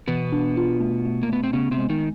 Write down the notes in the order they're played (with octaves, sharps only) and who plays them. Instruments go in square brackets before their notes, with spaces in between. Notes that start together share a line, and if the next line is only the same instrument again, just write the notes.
[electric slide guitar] B2 B3 [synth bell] E3
[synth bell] D4
F4
A3
A3
[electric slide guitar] A#3
[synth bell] A3 [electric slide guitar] B3
[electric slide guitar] C4
[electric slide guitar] C#3 C#4 [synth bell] B3
[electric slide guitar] C3 C4
[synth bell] G#3
[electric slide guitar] D#3 D#4